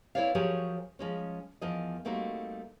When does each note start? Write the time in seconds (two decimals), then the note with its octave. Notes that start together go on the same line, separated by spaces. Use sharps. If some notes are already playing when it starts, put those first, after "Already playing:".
0.15 C4 E4 A4 C#5 D5 F5
0.35 F3 F#3 G4 G#4 A#4 C#5
0.99 F3 G#3 C#4
1.61 E2 F3 A#4 D#5
2.05 G3 A3 A#3 C4 D#4 F#4